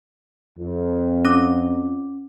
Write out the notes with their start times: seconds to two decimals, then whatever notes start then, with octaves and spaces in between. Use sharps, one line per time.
0.59 F2
1.25 C#4 D6